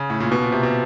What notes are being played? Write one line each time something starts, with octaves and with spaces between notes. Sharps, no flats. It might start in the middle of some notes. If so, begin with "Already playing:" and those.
Already playing: C#3
A2
A#2
B2
A#2
C3
B2